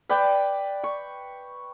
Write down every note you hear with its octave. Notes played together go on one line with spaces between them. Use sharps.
B4 D5 G5
C#6